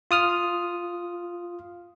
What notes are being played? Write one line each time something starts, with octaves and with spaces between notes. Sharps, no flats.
F4 D#6 F6